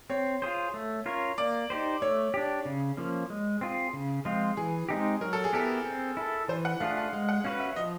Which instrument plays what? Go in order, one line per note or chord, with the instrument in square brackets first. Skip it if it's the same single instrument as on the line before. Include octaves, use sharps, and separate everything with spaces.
[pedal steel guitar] C4 [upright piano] C#5
[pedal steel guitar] F4 G#4 C5
A3
C#4 F4 A#4 C#5
[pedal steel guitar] A#3 [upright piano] D5
[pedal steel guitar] D#4 G4 C5
[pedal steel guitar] A3 [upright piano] C#5
[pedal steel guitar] D4 G4
C#3
F3 A#3 C#4
G#3
C4 F4 G#4
C#3
F3 G#3 C4 F4
[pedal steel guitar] E3 [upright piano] G#4
[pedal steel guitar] G#3 C4 D#4 G4
[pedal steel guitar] F#3 [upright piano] A#4
[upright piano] A4
G#4
[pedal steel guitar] B3 E4 G4 A#4 [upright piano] A4
[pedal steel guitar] C4
E4 A4
[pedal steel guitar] E3 [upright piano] C5
[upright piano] F#5
[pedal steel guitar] A3 D4 F4 G#4 [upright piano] F5
[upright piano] F5
[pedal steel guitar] G#3 [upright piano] F5
[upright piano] F#5
[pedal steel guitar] C#4 F#4 B4 [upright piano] F5
[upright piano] E5
[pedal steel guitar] F3 [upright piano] D#5